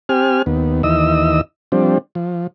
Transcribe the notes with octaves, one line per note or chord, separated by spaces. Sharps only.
C4 G4 G#5 F6
D#2 B3
D#2 E3 D#5 E6
F3 G3 C4 D4
F3